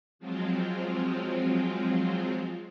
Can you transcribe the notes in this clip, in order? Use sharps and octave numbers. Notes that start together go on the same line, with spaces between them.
F3 F#3 G#3 C4 F4